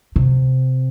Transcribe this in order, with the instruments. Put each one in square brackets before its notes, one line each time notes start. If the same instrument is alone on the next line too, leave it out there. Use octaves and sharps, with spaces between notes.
[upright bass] C3